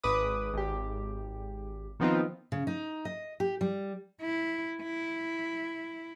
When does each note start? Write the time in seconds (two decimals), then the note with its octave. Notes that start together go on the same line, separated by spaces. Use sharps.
0.04 G#1 B4 D6 D#6
0.54 G#1 G4
2.00 D#3 F3 B3 C4 D#4 F4
2.52 C#3
2.67 D#4
3.05 D#5
3.40 G4
3.61 G3
4.21 E4
4.83 E4